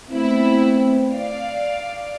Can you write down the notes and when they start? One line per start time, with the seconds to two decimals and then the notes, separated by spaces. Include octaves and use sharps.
0.11 A3 B3 C4 E4
1.11 D5 F5